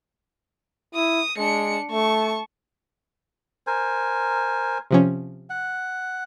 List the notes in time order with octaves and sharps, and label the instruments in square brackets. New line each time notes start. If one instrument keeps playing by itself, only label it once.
[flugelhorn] E4 [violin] D#6
[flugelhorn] G#3 [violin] D4 C#7
[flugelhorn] A3 [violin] A5 C#6
[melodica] A#4 C5 G#5
[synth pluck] C3 F3 C#4
[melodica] F#5